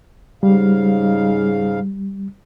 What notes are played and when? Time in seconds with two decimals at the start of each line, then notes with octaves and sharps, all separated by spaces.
0.43 G#2 C#3 G3 F5